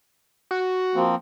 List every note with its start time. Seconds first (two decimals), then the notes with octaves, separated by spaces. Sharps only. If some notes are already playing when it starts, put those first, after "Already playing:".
0.51 F#4
0.95 F3 A#3 C4